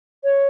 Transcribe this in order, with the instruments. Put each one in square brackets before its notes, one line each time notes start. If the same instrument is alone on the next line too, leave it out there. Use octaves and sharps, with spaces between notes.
[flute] C#5